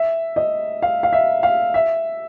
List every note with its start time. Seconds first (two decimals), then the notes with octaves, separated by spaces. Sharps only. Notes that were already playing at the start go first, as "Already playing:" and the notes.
Already playing: E5
0.36 D#5
0.82 F5
1.03 F5
1.13 E5
1.43 F5
1.74 E5